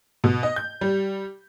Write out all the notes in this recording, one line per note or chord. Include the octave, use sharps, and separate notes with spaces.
B2
D#5
G6
G3